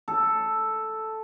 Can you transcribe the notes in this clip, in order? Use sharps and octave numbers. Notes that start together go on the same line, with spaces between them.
A4